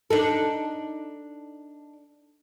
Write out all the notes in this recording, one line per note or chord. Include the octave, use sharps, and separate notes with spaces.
D4 D#4 A4